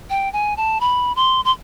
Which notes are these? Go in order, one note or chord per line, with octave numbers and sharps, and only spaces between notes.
G5
G#5
A5
B5
C6
C6